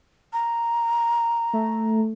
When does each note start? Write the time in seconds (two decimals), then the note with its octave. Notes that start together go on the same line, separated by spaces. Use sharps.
0.33 A#5
1.53 A3